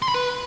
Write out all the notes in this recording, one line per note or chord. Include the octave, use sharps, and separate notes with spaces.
C6
B5
B4